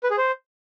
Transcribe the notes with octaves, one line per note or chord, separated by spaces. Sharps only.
B4
G#4
C5